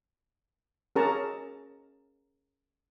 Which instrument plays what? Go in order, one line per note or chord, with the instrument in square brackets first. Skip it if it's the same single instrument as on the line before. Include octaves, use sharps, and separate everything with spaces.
[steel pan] C#4 G#4 A#4 A5 A#5 C#6